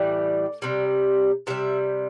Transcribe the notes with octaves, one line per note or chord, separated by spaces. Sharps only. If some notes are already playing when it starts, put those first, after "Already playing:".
Already playing: A2 E3 G3 D5
C3 G3
C3 G3 E5